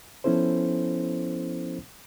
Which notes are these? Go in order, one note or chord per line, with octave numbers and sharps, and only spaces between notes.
F3 B3 C#4 E4 A4 C5